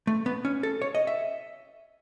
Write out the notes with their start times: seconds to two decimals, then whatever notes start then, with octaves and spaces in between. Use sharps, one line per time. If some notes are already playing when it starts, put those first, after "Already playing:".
0.07 A3
0.26 B3
0.45 C#4
0.63 A4
0.82 C#5
0.95 D#5
1.07 E5